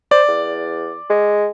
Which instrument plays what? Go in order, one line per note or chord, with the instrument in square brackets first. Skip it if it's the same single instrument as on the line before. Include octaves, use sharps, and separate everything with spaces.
[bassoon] C5 [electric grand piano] D5
[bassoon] E2
G#3